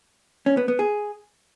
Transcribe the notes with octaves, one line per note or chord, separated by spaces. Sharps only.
C#4
B3
B3
G#4